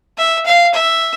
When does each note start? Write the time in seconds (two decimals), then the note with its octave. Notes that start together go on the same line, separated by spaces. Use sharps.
0.18 E5
0.46 F5
0.74 E5